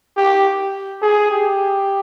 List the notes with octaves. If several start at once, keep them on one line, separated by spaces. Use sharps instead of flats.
G4
G#4
G4